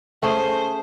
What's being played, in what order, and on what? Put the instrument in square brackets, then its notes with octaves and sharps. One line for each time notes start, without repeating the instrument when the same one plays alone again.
[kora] A3 C#4 G#4 [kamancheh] C5